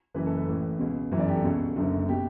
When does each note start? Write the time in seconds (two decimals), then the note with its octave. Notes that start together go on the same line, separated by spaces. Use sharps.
0.14 F#1 F#2 E3 B4
0.26 A4
0.37 B4
0.47 A1 A2 E3
0.79 C#2 B2
1.11 G1 F#2 E3
1.19 D5
1.28 G4
1.35 A4
1.43 C#2 B2
1.76 F#1 F#2 D3
2.08 B2 G4